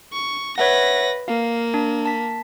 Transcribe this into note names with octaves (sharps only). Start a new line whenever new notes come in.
C#6
B4 C#5 E5 F#5 A#6
A#3 F5
D4
A5 B6